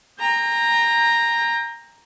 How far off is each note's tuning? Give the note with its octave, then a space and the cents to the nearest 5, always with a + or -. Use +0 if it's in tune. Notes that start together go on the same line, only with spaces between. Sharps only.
G5 +35 A#5 +0